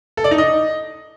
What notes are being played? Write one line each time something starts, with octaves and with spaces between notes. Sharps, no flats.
A4
D5
D#4
D#5